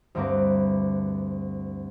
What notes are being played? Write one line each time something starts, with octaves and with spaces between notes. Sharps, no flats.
D2 G2 C4 A#4 B4 D6